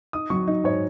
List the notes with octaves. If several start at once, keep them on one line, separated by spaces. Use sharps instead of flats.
D#4 D#6
F#3 C#6
D#4
G#2 C#5